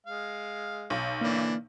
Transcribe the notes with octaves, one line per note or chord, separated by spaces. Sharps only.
G#3 F5
B1
D3 E3 A#3 D4